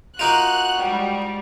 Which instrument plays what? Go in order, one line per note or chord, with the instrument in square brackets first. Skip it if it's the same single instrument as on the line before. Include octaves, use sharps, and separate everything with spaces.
[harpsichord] A#3 D#4 F4 [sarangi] F#4 [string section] F#6 [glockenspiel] F7
[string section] G#2 G3